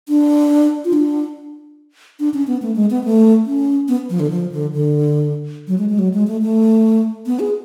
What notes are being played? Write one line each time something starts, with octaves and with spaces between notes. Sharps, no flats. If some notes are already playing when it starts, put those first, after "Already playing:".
D4
F4
D4
D4
C#4
B3
A3
G#3
B3
A3
C#4
B3
F3
D3
F3
D3
D3
F#3
G#3
G#3
F#3
G#3
A3
A3
B3
G#4